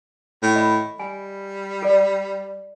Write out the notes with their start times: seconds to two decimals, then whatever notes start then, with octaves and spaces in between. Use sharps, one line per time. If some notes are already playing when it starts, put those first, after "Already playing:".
0.42 A2
0.56 D#5 B5
0.99 G3 G#5
1.82 A4 D5